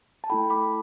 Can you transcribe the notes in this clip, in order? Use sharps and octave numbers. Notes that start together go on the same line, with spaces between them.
A5
A3 E4 A4 G5 B5
B5 D6